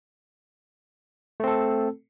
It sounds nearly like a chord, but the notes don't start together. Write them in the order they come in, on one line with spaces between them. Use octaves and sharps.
A3 C4 A4